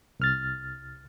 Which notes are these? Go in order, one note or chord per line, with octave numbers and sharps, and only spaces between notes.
C2 F6 A6